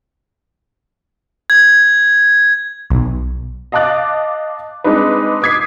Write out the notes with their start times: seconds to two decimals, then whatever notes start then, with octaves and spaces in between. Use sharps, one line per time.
1.50 G#6
2.90 B1
3.72 D#5 F5 A5 D6 F#6 A6
4.84 G#3 C4 D4 D#4 B4
5.42 D6 D#6 G#6 B6 C7